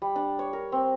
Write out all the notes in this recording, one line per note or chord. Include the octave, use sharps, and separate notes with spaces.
G3
D4
C#5
A#4
C4